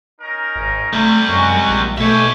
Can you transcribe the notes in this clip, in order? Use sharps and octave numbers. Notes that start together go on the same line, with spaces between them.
C#4 D#4 A#4
G#1
C3 G3 A3
F#2 G#3 F#4
A#1
B2 A3 G4 C#5 E5 G#5